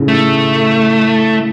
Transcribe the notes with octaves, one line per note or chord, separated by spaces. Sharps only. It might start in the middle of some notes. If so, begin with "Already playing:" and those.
Already playing: A2 C#3
A3